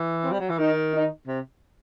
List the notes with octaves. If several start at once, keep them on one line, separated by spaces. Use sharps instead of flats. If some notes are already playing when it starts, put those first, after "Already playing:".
Already playing: E3
C4
G3
F#3
E3
D#3 D#4
D#4
C3